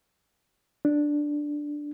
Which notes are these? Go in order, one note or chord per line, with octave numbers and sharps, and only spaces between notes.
D4